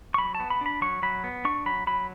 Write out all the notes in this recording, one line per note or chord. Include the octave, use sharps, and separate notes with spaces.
C#6
F#3 B5
A5
B3
B5
D4 B5
F#3 C#6
F#3 B5
B3
D4 C#6
F#3 B5
F#3 B5